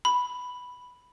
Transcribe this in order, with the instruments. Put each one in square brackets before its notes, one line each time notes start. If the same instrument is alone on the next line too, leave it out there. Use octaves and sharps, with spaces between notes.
[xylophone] B5